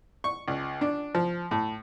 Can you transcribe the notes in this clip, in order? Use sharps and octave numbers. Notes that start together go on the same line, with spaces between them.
C#6
C#2
D4
F3
A2